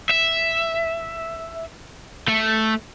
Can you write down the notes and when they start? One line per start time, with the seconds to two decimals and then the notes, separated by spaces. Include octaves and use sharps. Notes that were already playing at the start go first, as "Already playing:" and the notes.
0.11 E5
2.29 A3